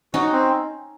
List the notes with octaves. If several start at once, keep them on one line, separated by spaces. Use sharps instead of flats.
C#4 D#4 F#4
C4